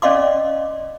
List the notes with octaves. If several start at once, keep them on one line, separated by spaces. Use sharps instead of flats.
C#4 D5 D#5 F5 C6 D6